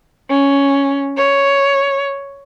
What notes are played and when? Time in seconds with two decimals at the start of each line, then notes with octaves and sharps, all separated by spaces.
0.30 C#4
1.17 C#5